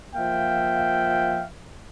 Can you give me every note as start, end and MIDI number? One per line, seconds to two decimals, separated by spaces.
0.15 1.44 53
0.15 1.44 58
0.15 1.44 76
0.15 1.44 77
0.15 1.44 79